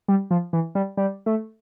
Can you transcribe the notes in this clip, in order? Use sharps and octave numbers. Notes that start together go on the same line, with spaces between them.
G3
F3
E3
G3
G3
A3